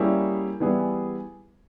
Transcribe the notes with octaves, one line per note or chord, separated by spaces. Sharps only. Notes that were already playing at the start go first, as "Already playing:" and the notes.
Already playing: G3 A#3 C#4 E4 G#4
E3 G3 B3 E4 G#4